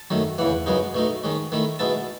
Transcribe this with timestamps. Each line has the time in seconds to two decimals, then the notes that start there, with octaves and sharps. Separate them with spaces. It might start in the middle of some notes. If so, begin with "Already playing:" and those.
Already playing: A5
0.10 F#2 D#3 A3
0.38 E2 C#3 E3 F#5
0.66 F#2 C#3 G#3 B3 D#4
0.94 B2 A3 D#4
1.23 D#3 G#3 C#4
1.52 D#3 A3 E4
1.79 B2 G#3 B3 E4 A5